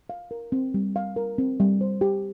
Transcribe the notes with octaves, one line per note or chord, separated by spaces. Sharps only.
F5
A#4
C4
G3
F5
A#4
C4
G3
C5
G4